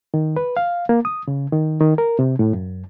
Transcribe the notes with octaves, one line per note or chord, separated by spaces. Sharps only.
D#3
B4
F5
A#3
D#6
C#3
D#3
D#3
A#4
C3
A2
F#2